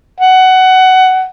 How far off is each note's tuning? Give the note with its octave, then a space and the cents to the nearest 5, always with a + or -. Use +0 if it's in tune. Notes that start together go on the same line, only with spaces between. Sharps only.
F#5 +15